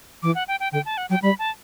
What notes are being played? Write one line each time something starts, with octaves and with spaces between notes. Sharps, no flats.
E3 D6
F#5
G5
G5
D3 G5
A5
F#5
F#3 G5
G3 B5
A5